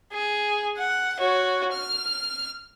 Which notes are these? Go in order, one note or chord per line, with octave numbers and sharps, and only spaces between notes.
G#4
F#5
F#4 C#5
F6